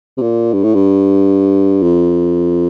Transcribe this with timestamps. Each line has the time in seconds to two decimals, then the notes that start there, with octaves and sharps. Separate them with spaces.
0.17 C3
0.22 A#2
0.53 G2
0.64 A2
0.75 G2
1.82 F2